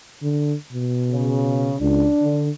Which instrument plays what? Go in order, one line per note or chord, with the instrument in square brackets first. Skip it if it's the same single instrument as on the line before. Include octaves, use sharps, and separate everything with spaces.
[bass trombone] D3
B2
[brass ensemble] C#3
[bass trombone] C#2 [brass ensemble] D4
[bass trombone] D3